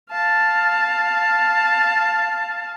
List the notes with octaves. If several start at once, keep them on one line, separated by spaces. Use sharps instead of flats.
F5 A5